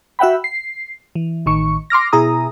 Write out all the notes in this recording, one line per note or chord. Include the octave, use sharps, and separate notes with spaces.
F#4 E5 F#5 G5 B5
C7
E3
A1 D#3 C#6
C6 D6 F6 A#6
B2 E4 G#4 A#5 D#6